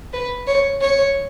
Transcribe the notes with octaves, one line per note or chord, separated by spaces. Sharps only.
B4
C#5
C#5